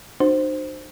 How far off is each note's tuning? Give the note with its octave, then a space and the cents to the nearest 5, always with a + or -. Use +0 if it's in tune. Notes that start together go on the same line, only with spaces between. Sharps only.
D#4 -45 F#4 +0 C5 +0